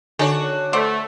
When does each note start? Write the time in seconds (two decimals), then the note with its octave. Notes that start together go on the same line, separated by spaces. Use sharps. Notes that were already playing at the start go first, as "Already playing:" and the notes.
0.19 D3 D#3 D4 F#4 C#5
0.73 A3 C5 D5 F#5